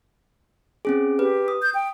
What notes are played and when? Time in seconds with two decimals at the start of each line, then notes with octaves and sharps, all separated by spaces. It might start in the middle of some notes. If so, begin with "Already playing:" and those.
0.85 C4 C#4 G#4
1.19 G4 B4
1.48 D#6
1.62 G6
1.74 G5